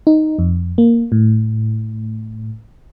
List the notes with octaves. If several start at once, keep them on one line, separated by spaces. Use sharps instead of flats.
D#4
F2
A#3
A2